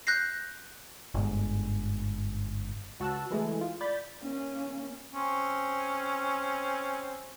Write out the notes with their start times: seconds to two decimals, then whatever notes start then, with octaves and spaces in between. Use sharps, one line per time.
0.07 F#6 G6 A#6 C7
1.14 G1 G#2
3.00 C#2 F#4 A5 E6 F#6
3.31 E3 G#3 A3 E4
3.61 F4
3.81 D5 B5 G6 A6
4.20 A#3 C#4
5.12 C4 C#4